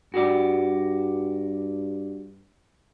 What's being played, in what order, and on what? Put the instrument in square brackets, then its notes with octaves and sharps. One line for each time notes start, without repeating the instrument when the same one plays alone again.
[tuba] G2 [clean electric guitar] F#4 G4 D5